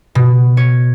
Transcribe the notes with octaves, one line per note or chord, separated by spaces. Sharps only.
B2
C#5